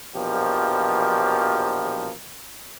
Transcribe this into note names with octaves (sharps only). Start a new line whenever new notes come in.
A#1 E2 B2 F3 G4 A#4